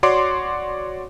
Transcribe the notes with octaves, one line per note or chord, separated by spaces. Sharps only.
F#4 C#5 D5 C6 D6